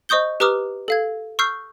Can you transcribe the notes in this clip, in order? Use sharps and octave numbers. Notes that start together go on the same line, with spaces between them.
C5 D#5 C#6 D#6 G6 G7
G4 B4 A#5 D6 D#6 F6
A4 F5 G#6
C#6 E6 F6 G6 C7